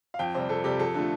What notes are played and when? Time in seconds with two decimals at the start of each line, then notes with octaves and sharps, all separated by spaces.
0.14 F5
0.19 F2 G5
0.35 C3 G3 C5
0.49 F2 A4
0.64 C3 G3 G4
0.79 F2 A4
0.94 D3 F3 A3